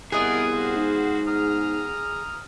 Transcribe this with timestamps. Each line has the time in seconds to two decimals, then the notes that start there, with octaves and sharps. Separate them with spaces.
0.12 C2 B3 E4 F4 G#4 A#4 D#5
0.50 F#4 C5 F5
0.76 G#2
1.27 A#5 D#6 F6